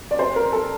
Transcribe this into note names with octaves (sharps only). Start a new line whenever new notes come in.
D5
C5
A#4
A4